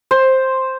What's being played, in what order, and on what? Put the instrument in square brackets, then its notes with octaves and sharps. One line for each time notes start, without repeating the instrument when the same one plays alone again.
[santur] C5